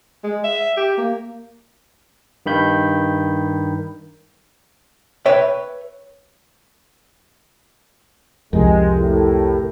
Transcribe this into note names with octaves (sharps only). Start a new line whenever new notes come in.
G#3
E5
G4
A#3
G2 D#3 B5 G6
B4 C#5 E5 G5
C2 F2 G#3 G4 A#4
A2